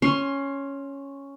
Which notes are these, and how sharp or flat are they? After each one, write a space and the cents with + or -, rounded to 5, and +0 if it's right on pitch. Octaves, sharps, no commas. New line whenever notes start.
C#4 +0 C6 +20